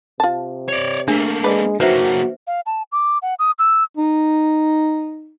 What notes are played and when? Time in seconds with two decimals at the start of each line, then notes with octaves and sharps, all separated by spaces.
0.20 C3 F4 A5
0.68 C#5 D5
1.08 A3 A#3 D4 G#4
1.44 G#3 B4 D5
1.80 F#3 A#3 D#4 F#4 B4 C5 E5
2.47 F5
2.66 A5
2.92 D6
3.22 F#5
3.39 D#6
3.59 E6
3.97 D#4